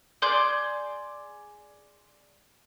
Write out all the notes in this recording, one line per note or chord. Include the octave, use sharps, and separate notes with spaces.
G#4 D5 C6 G6